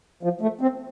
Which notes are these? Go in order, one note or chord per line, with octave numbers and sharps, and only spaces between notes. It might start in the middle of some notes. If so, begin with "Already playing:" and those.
F3
A3
C4